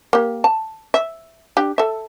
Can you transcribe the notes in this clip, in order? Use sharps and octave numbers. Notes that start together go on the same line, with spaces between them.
A#3 G4
A5
E5
D4 G4
A4 E5